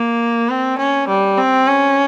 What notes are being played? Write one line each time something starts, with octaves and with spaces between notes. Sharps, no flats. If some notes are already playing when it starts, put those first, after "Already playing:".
Already playing: A#3
C4
C#4
G3
C4
C#4